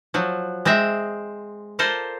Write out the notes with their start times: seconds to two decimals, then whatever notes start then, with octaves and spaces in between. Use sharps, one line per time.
0.14 F3 F#3
0.65 G#3 C4 D#5 E5
1.79 F4 A4 A#4 C5 D5